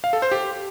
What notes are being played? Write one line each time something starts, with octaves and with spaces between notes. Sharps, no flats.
F5
A4
C5
G4